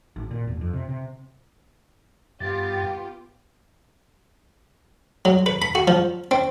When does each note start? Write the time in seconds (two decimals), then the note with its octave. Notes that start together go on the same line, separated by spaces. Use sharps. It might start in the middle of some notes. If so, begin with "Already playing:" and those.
0.16 G#1
0.31 A#2
0.47 E1
0.61 F2
0.73 C3
0.89 C3
2.40 G2 B3 F4 G4 A6
5.25 F#3
5.46 B4
5.62 B5
5.75 F#4
5.88 F3
6.31 C4